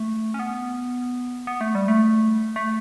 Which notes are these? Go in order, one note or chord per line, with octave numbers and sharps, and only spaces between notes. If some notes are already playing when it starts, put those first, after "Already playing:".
Already playing: A3
C#4
B3
B3
A3
G3
A3
A3